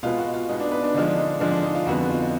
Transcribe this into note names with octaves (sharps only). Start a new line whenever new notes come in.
B2 G#3 B3 F4
F#4
F4
B2 G#3 B3 D#4
D4
B4
D4
D3 F3 G#3 D#4
D4
D#4
D3 F3 G#3 D4
D4
D#4
F4
F2 D3 G#3 B3 F#4
F4